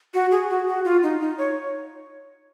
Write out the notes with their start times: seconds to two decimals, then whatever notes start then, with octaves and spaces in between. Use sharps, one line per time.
0.14 F#4
0.31 G#4
0.49 F#4
0.67 F#4
0.85 F4
1.03 D#4
1.21 D#4
1.38 C#5